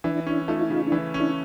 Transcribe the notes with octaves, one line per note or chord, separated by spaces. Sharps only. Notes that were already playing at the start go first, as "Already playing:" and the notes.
E3 D4 E4
C#4 D4 E4
A3 D#4 F4
E4
C#3 D#4 F4
D4 E4
E3
C#4
D4 E4